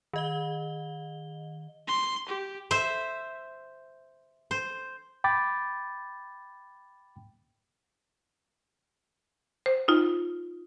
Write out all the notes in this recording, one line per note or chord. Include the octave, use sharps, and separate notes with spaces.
D#3 D#5 G7
C6
G4
C5 E5
C5
G5 B5 D6 A6
C5
D#4 F4